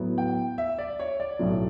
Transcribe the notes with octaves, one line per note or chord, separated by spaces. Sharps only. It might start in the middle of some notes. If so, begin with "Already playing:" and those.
Already playing: A2 F#3 B3 E4
G5
E5
D5
C#5
D5
B1 A2 F#3